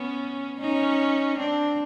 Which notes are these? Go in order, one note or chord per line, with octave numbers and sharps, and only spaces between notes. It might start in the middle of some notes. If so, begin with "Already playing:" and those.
Already playing: B3 C#4
C#4 D#4
C4 D4